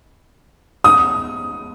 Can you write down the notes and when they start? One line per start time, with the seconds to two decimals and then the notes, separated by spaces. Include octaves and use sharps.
0.84 D#6